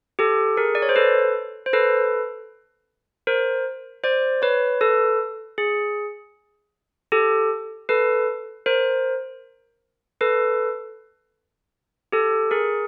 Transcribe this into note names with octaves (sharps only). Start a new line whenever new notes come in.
G4 A4
G#4 A#4
D5
C#5
C5
A4 B4
C5
A4 B4
A#4 C5
C5 D5
B4 C#5
A4 B4
G#4
G4 A4
A4 B4
A#4 C5
A4 B4
G4 A4
G#4 A#4